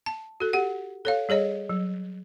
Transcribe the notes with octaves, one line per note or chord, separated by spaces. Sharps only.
A5
F#4 A4
G4 F#5
A4 C#5 F5
G3 G#4 C#5 D#5
F#3